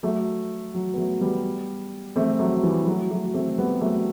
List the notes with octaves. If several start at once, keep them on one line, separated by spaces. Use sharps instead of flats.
F#3 A3
F#3
B3
F#3 A3
G3 B3
A3 C4
F#3 A3
E3 G3
F#3 A3
F#3 A3
A3 C4
G3 B3
F#3 A3